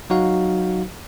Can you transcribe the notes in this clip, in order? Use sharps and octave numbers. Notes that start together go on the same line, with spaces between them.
F#3 D#4 F#4 F5